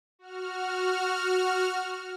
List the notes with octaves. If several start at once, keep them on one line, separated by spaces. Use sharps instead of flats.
F#4 F6